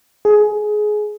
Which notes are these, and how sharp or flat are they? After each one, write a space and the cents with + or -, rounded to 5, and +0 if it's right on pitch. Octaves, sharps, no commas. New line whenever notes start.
G#4 +20